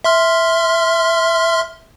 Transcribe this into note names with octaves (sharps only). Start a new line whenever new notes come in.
E5 C6 F6